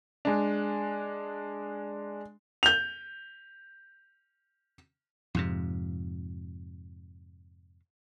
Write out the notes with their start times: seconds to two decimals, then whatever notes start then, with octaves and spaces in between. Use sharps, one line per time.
0.25 G#3 D4
2.63 G6 F7
5.35 F2 G#2 C3